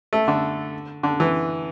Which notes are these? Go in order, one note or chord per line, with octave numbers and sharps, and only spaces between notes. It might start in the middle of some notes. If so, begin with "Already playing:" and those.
A3
D3
D3
E3